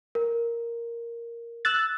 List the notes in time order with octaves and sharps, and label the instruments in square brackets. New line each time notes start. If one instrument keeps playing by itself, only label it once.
[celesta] A#4
[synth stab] E6 F#6 A6